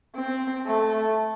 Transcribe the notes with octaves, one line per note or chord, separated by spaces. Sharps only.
C4
A3